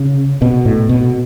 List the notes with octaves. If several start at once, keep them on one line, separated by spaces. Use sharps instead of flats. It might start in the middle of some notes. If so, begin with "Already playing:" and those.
Already playing: C#3
B2
A2
B2